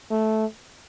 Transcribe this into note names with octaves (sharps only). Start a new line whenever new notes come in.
A3